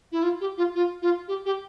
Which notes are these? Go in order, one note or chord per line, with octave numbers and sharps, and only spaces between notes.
E4
F4
G4
F4
F4
F4
G4
G4